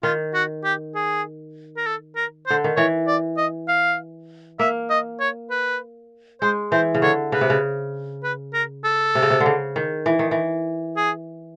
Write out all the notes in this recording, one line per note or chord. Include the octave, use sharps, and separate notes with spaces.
D#3 F4
F#4
G4
G#4
A#4
A4
A#4
D3 C5
D#3
E3 C#5
D5
D#5
F5
A#3 E5
D#5
C#5
B4
G#3 C5
E3 C5
C#3
D3 C#5
C#3 B4
C3
C#3
B4
A#4
A4
C3
C#3
C3
D3
C#3
D#3
E3
D#3
E3
G#4